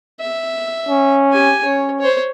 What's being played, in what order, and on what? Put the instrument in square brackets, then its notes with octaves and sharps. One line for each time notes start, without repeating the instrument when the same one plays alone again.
[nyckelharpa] E5
[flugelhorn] C#4
[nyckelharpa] G4 G#5
[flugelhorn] C#4 [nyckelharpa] C#5
[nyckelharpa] C5 C#5